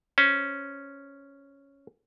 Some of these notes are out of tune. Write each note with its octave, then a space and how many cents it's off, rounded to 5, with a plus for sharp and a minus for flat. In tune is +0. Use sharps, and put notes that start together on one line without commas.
C#4 +0 C5 +0